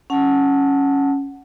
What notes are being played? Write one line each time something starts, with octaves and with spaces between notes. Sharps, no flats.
C#4 F#5 A5